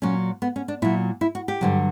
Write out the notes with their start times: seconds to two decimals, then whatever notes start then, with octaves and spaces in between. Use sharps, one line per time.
0.02 A#2 F#3 C#4
0.42 B3
0.56 C#4
0.68 D4
0.82 A#2 F#3 E4
1.21 E4
1.35 F#4
1.48 G4
1.61 G2 D3 F#3